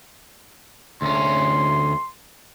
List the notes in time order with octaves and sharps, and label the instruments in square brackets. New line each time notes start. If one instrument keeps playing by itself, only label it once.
[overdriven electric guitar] D2 C#4 [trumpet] C6